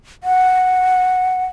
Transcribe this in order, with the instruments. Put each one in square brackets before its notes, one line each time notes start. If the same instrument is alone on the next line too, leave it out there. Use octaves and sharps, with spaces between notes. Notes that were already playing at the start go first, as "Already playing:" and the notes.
[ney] F#5